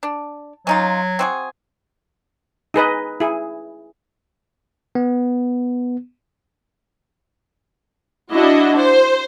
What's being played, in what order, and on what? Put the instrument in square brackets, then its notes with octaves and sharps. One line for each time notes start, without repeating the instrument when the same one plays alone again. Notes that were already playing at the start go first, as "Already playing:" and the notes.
[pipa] D4
[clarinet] F#3 [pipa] C#4 D#4 F4
[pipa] C4 F#4 G#4
[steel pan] D#4 G#4 B4 D#5
E4 G#4
[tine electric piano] B3
[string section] D4 E4 F#4 D#5
C5